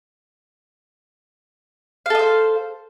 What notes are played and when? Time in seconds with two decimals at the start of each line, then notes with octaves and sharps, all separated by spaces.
2.06 F5
2.10 A4
2.15 D#5
2.19 C5